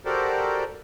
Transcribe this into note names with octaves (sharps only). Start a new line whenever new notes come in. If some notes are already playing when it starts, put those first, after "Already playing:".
F#4 G4 A4 A#4 C5 D5